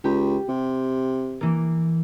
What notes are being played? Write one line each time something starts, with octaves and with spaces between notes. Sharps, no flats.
C#2 G4
C3
E3 A#3